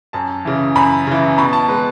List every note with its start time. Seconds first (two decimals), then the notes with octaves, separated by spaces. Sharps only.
0.13 F#2 A5
0.45 C#3 E3
0.75 F#2 B5
1.07 C#3 E3
1.38 B2 B5
1.53 A5
1.68 G#3 B4